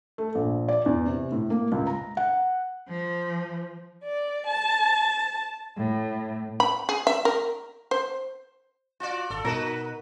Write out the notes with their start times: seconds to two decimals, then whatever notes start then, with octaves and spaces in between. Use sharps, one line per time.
0.18 A3
0.35 A#1
0.68 D5
0.86 E2
1.06 C3
1.32 A2
1.50 A#3
1.72 C#2
1.87 A#5
2.17 F#5
2.89 F3
4.04 D5
4.45 A5
5.77 A2
6.60 B5
6.89 G#4
7.07 E5
7.25 A#4
7.91 C5
9.00 F4 F#4 D5
9.30 G#1 A4
9.45 B2 D#4 F#4 A#4 B4